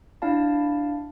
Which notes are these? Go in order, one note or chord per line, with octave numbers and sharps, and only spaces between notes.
D4 E4 F5 A5